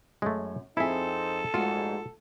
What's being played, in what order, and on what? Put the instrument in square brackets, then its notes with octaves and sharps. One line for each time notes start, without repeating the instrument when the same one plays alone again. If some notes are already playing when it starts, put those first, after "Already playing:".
[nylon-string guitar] F#2 [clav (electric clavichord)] G#3 A3
[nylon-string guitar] F2 G#4 [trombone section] C4 D#4 [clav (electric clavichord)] E4 E5 [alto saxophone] A4
[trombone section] A#1 G#2 [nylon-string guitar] G#3 A3 F#4 [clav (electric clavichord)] F4